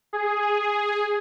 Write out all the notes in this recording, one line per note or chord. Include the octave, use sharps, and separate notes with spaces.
G#4